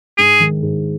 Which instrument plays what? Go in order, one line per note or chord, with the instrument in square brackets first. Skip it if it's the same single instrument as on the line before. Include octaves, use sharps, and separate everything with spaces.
[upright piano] G#2 [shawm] G#4
[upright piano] D#3 G#3
G#2